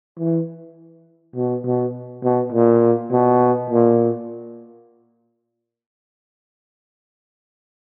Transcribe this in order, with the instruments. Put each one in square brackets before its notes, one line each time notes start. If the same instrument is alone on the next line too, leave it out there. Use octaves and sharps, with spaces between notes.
[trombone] E3
B2
B2
B2
A#2
B2
A#2